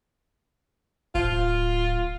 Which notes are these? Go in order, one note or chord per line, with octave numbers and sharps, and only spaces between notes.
D1 F4